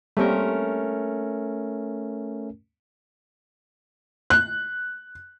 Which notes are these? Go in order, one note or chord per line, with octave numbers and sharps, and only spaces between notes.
G3 A3 A#3 C4 C#4 A#4
F#6